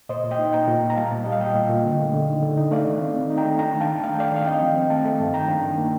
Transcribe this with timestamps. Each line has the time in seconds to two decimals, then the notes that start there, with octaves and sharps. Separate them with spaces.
0.09 A#2 C5 D#5
0.24 A#2
0.31 D#5 G5
0.39 D#4
0.53 A#2 G5 A#5
0.68 A#2
0.82 A#2
0.90 A#5
0.97 G3 F5 A5
1.12 A#2
1.24 G3 D#5
1.32 F5
1.40 A#2 D#5 G5
1.55 A#2
1.69 A#2
1.84 D3
1.99 A3
2.14 D3
2.28 D#4
2.43 D3
2.57 D#4
2.71 A3 D5 F5
2.87 D#3
3.01 C4
3.16 D#4
3.30 D#4
3.37 G5 A#5
3.45 A3
3.59 D4 G5 A#5
3.74 D#3
3.80 F5 A5
3.89 D4
4.03 A3 F5
4.12 G5
4.18 A3 D5 F5
4.31 D#3 F5
4.46 C4 D#5 G5
4.61 F3
4.76 C4
4.90 A3 F5 A5
5.05 A3
5.20 G2
5.33 D#3 G5 A#5
5.49 D4
5.63 D#3
5.78 A#3